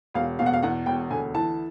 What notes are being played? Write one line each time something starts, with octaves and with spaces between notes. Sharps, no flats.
E1 F5
B2 F5
F#5
F5
E2 F#5
E1 G5
D2 G#5
E3 A5